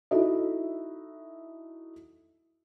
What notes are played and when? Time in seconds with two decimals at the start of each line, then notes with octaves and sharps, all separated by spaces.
0.11 D#4 E4 F#4 A4 D#5 E5